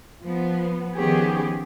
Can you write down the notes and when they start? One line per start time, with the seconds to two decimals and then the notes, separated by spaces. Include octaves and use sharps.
0.23 F3 B3
0.94 D#3 F3 B3 C#4 G4 G#4